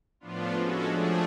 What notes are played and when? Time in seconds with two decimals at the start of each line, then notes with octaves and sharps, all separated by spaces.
0.20 A2 F3 B3 D4 F4
0.52 G#3 C#4 F#4 A4
0.85 F3 A3 D4 G#4